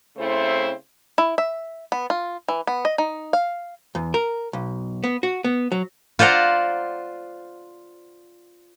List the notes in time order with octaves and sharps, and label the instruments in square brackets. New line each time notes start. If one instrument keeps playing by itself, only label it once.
[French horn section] C#3 A3 C4 E4 C5
[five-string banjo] E4
E5
B3
F4
E3
B3
D#5
D#4
F5
[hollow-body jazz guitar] E2
A#4
B1
B3
F#4
B3
F#3
[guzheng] F4 C5 D5 F#5 A#5